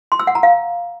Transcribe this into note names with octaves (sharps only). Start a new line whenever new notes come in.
C6
E6
F#5
A#5
F5